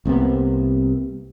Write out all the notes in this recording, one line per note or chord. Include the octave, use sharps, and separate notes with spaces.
C2 C3 A#3 B3